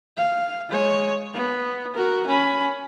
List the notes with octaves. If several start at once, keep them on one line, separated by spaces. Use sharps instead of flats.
F5
G#3 C#5
B3
F#4 A#4
C#4 B5